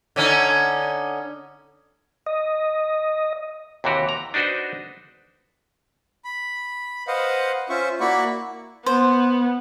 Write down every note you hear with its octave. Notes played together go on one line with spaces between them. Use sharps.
D3 C#4 D#4
D#5
D#2 C3 E3 F#4 G4
A#5
D4 D#4 F#4 B4 C5
B5
B4 C5 D#5 F5 F#5
C#4 F4 C5 E5 C#6
A#3 E4 F#4 D5 B5 C#6
B3 C5